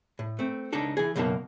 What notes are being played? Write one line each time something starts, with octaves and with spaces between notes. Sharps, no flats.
A2
A3 C4
C#2 D4 D#4 A4
E3 G#4
C#2 F#2 B2 A#3 D#4 A5